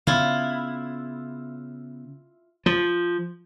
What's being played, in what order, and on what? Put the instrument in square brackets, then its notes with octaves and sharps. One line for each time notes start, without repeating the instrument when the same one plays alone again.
[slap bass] C#3 B3 [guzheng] E4 F4
[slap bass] F3